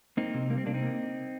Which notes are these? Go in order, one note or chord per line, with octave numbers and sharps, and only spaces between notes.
A#3 C4 D#4
C3
G3 A#3
C4
C3 A#3 D4
C4 D#4
A#3